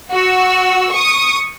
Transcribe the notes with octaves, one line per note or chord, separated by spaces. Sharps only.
F#4 E6
C#6 D#6